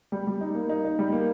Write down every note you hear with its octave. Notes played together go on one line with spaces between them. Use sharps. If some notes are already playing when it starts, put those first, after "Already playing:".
G3
G3
D#4
A#3
D#4
D#4
G3
A#3